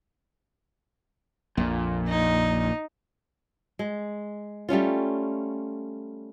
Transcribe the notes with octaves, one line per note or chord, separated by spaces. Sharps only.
A#1 F2 A#2
D#4
G#3
G3 A3 C#4 F4